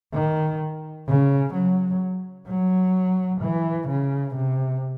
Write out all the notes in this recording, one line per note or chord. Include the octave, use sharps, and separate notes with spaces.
D#3
C#3
F#3
F#3
E3
C#3
C3